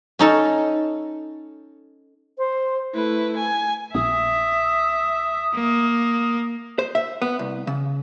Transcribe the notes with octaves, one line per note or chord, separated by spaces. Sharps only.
C#4 D#4 A4
C5
A3 E4 B4
G#5
A#1 E5 D#6
A#3
C5
E5
B3
C2
C#3